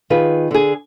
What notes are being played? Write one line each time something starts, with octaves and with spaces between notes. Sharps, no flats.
D#3 F4 G#4 B4
D3 G#4